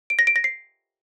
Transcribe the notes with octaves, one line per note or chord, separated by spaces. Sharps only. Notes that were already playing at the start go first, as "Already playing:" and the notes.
D7
A#6
D7
A#6
C7